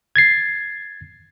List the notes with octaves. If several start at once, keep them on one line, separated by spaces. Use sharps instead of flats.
G#6 A6 C7